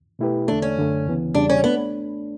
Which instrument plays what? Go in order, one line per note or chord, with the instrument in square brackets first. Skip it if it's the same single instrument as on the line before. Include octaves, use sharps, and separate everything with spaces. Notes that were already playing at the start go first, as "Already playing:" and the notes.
[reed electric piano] B2 A3 E4 G4 B4
[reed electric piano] E2 D3 A3 [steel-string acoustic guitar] D4
[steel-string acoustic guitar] C#4
[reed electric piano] F#2 D3 A3
D2 C#3 E3 B3
[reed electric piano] E2 C#3 G3 [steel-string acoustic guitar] D4
[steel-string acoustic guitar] C#4
[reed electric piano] A3 D4 [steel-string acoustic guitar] B3